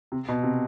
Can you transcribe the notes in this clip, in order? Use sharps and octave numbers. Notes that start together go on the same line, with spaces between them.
C3
B2
C3